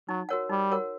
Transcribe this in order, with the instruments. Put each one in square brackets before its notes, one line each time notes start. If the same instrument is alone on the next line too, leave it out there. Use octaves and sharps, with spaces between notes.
[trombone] F#3 [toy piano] D#4
[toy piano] F#4 A#4 C#5 F#5
[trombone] G3 [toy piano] D#4
[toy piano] F#4 A#4 C#5 F#5